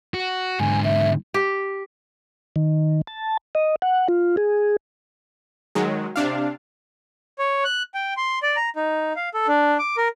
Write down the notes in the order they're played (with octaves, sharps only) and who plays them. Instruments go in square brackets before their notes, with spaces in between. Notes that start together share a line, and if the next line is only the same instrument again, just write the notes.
[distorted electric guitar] F#4
[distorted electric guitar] G#2 D3 [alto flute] G#5
[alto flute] E5
[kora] G4
[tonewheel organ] D#3
A5
D#5
F#5
F4
G#4
[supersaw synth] D#3 F#3 G#3
C3 D4 F5
[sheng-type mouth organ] C#5
F#6
G5
C6
D5
A#5
D#4
F5
A4
D4
D6
A#4